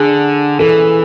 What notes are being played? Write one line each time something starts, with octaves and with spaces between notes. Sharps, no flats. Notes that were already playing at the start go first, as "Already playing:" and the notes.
Already playing: D3 G#4
E3 A4